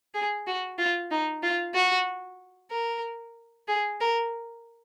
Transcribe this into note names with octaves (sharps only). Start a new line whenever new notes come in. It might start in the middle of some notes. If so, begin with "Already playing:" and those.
G#4
F#4
F4
D#4
F4
F#4
A#4
G#4
A#4